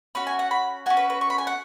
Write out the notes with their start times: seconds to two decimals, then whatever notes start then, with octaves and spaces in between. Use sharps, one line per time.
0.15 C#4 F#4 B5
0.27 G#5
0.39 F#5
0.51 B5
0.86 C#4 F#4 G#5
0.97 B4
1.10 B4
1.21 C#6
1.30 B5
1.38 G#5
1.47 F#5